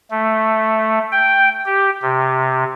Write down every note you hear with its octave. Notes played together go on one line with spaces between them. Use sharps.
A3
G5
G4
C3